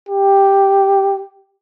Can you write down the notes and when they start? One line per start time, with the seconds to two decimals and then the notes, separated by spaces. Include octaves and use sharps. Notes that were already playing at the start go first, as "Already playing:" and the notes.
0.09 G4